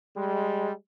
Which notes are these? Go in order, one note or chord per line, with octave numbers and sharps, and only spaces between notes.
G3 G#3